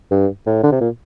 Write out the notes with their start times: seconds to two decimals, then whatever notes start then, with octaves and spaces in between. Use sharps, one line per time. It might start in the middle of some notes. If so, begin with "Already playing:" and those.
0.11 G2
0.47 A2
0.63 D3
0.72 C3
0.81 A#2